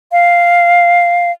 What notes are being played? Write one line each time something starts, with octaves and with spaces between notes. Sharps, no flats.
F5